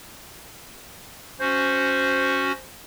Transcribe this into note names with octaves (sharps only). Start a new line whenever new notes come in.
C#4 F#4 C5